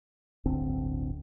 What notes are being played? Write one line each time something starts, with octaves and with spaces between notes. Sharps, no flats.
D1 G1 D3 C4